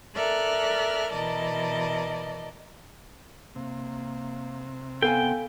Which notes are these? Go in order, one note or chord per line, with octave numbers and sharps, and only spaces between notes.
A4 A#4 D5 E5 F6 F#6
B2 E3 A#4 D5 D#5 A5
C3 A#3
B3 A4 F5 G5 G#5